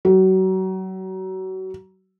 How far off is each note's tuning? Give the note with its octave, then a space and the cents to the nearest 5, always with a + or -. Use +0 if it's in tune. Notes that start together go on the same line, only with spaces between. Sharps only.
F#3 +30